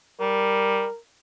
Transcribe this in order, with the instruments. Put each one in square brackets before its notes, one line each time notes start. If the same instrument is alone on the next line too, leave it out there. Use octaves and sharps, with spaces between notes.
[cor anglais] G3 [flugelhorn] A#4